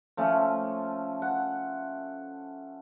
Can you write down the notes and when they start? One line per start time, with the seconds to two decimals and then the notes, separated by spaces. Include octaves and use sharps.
0.17 F3 A3 C#4
1.22 F#5